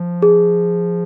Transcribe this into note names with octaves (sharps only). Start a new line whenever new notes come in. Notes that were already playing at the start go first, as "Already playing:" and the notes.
Already playing: F3
G#4